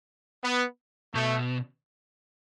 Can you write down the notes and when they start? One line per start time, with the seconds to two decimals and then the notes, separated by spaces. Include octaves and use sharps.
0.44 B3
1.15 B2 A3